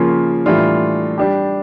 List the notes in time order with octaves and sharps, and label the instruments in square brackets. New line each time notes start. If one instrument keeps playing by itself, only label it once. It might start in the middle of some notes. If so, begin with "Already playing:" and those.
Already playing: [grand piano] C#3 F3 A#3 C#4 F4
A2 E3 G3 D4 F4
G3 D4 G4